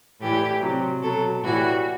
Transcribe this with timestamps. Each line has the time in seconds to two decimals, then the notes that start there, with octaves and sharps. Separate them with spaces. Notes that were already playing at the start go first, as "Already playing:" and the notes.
0.20 A2 E3 G3 G4
0.61 C3 F#3
1.01 B2 F#3 A4
1.42 A2 E3 G3 F#4